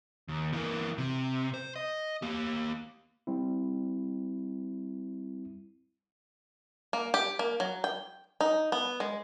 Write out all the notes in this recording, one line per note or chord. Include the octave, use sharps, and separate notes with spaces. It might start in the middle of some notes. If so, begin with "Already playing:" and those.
D#2
E3 A#3
C3
C5
D#5
A#3 G4
G3 C4 E4
A#3
G4
A#3
F#3
G5
D#4
B3
G#3